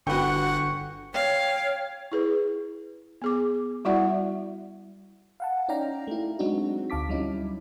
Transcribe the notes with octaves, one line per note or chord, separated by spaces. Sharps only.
G1 D3 F#4 B4 F#5 G5 C#6
C#5 F5 G5
E4 G#4 B4
B3 G#4 D6
G3 E4 F#4 D5 E5 F#5
F5 F#5 A5
C#4 D#4 D5 F5 G5 A#5
A3 E4
F#3 G#3 C4 D4 D#4 F#4
D2 F5 A5 D6 B6
F#3 G3 C#4 D#4 E4